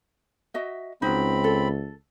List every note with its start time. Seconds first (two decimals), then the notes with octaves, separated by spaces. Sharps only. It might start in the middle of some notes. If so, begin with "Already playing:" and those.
0.54 F#4 D#5 E5
1.02 C#2 C4 D#4 E4 F#4 B5
1.44 A4